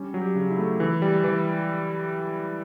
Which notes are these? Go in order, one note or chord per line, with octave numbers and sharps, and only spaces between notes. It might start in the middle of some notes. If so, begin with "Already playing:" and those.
Already playing: G3 C#4
F#3
G4
C#3
E4
A3
E3
G3
E3